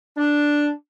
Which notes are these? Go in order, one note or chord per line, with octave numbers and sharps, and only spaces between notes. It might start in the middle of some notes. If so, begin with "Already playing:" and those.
D4